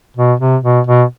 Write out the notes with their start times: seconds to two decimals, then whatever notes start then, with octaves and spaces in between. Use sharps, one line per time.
0.17 B2
0.40 C3
0.64 B2
0.87 B2